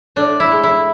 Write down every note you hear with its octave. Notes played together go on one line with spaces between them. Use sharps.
A2 D4
E4
G#3
E4